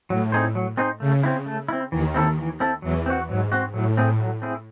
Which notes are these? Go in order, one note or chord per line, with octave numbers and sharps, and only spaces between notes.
A2 F#3
C4 D#4 G#4 C5
F#3
C4 D#4 G#4 C5
C#3 A3
C4 E4
A3
C4 E4
D#2 D#3 E3
C4 E4 A4
E3
C4 E4 A4
E2 E3 F#3
C4 F#4
G#2 F#3
C4 F#4
A2 F#3
C4 E4 G#4
F#3
C4 E4 G#4